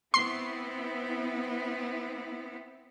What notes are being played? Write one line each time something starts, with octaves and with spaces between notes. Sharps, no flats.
B3 C4 E4 C6 C7